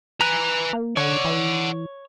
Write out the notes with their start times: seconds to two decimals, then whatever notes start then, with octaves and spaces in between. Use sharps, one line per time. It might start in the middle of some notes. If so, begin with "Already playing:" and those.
0.21 B4 G#5 A#5 F#6
0.73 A#3
0.97 D3 C#5 D5 F#5
1.25 E3